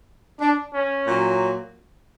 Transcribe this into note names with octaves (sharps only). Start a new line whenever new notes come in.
D4
C#4
A#2 F#3